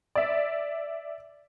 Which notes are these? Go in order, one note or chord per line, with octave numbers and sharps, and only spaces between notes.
D5 E5